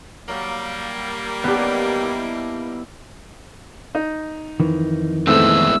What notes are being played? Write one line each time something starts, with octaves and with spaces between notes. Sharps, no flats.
F#3 G3 A#3 F5
D#3 F#3 B3 D4 G4
E4
D#4
F2 D#3 E3
A2 G#3 B3 C4 E4 A4 E6